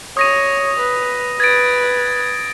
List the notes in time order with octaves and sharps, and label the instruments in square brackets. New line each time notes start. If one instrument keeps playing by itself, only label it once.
[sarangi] C#5 [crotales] D#6 A#6 D#7
[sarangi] B4
[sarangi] B4 [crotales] G#6 A6 D7